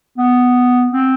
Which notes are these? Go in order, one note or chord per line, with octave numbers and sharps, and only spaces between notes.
B3
C4